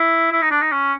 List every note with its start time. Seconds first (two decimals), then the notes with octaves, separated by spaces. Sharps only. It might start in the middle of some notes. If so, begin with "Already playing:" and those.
Already playing: E4
0.32 E4
0.42 D#4
0.51 D4
0.61 D#4
0.72 C#4